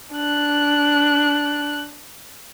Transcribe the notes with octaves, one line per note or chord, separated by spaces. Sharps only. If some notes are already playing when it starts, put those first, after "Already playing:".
D4 F#6